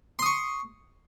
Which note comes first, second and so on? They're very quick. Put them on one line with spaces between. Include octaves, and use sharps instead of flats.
C6 D#6 C#6